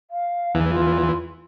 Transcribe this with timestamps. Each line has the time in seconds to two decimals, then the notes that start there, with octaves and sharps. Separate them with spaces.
0.11 F5
0.55 E2 E3
0.69 F4